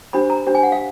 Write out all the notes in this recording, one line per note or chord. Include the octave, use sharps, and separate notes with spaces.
D4 G4 C5 B5
A#5
D4 G4 C5
G#5
F#5
F5